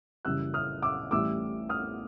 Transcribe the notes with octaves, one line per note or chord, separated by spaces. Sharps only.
F#1 F#2 C#3 E3 G3 E6 F#6
D#6 F6
D6 E6
A1 A2 E3 G3 D6 E6
D#6 F6